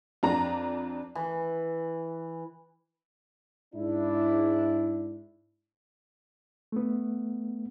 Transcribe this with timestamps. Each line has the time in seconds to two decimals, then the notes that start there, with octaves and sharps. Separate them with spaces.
0.23 F2 D4 A#5
1.15 E3
3.75 G#2 D4 E4
6.72 A3 B3